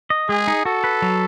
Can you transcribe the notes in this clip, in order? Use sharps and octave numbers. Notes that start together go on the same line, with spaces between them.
D#5
G#3 G#4
D#4
F#4 A4
B4
F#3